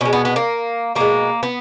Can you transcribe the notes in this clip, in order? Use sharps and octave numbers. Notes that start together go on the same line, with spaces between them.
B2 G#3 C#4
B3
B3
A#3
B2 G#3 A#3
B3